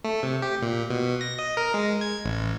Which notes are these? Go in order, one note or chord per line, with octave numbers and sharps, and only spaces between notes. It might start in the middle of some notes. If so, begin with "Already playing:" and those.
A3
C3
G4
A#2
B2
A#6
D#5
A#4
G#3
G#6
A1